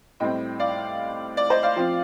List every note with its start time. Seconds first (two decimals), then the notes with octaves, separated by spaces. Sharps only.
0.20 A2 G3 C4 D#5 G5
0.59 D5 F5
1.37 D5
1.50 C5 D#5
1.63 D5 F5
1.76 F3 C4 F4